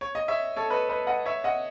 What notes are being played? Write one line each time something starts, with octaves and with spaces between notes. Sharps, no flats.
C#5
D#5
C#5 E5
A4 C#5
B4 D#5
B4 D#5
D#5 F#5
C#5 E5
D#5 F#5